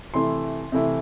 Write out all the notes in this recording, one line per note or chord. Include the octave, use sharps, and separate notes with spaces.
C3 E3 A3 E4 C6
C3 E3 A3 E4